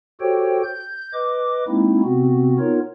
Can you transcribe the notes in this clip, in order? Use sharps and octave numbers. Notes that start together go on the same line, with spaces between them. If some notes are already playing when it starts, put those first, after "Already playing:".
F#4 G4 A4 C5 C#5 G5
G6
B4 D#5 D6
G#3 A#3 C4 D#4 E4
C3 B3 C4 F#4
B3 D#4 F4 A#4 C#5